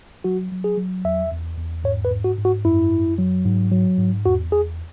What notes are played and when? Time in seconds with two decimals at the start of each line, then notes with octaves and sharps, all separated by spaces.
0.24 F#3 F#4
0.52 F#3
0.64 G#4
0.77 F#3
1.05 E2 E5
1.31 E2
1.58 E2
1.84 G#2 C#5
2.05 B4
2.12 G#2
2.24 F#4
2.38 G#2
2.45 F#4
2.65 F#2 E4
2.91 F#2
3.18 F#3
3.46 G#2
3.71 F#3
3.98 G#2
4.25 E2 F#4
4.52 E2 G#4